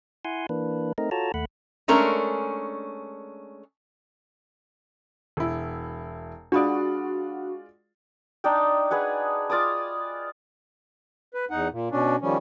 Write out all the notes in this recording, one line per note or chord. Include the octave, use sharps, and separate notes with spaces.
E4 F#5 G#5 C6
E3 A#3 D4 B4
A3 C4 D#4 A#4 D#5
F4 F#4 A4 C#5 A5 A#5
D#2 A3 F#5 B5
G#3 A3 C#4 D4 A#4
E1 E4
G#3 D4 F4 F#4 D5 B5 D#6
D4 D#4 D5 G5
G#4 B4 F#5
F4 D5 D6 D#6
B4
E2 D#4 F#5
A#2
B2 C#4 D4
D#3 F3 G3 C#4